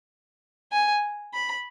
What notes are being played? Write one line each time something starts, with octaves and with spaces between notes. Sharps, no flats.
G#5
B5